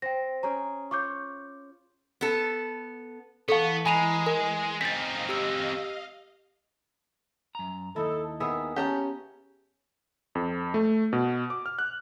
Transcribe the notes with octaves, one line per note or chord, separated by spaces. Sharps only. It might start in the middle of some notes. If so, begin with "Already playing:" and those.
C4 G5 A#6
C#4 G#4 G5 A#5
F4 C#5 C#6 D6 G6
B3 A4
E3 B3 A4 F5 A5 C#6 C#7
G#3 G#5 A#5 B5 D#7 F7
A#4 G#5
C4 D#4 D#5 F5 A6 B6
G4 E6
F#2 A#5
D#2 D#4 E4 A4
D#3 B3 G#4 E5
C#4 G4 A5 A#5
F2
A3
B2
D6
F6
F#6